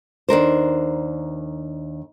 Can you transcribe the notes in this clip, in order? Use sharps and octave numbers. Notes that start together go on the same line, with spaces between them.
D#2 D4 A#4 C5